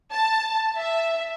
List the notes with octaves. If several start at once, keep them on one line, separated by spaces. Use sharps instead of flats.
A5
E5